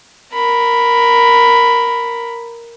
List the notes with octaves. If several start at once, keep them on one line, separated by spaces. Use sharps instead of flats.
A#4 B5